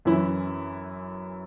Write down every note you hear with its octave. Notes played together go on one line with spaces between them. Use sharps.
F#2 E3 C#4 E4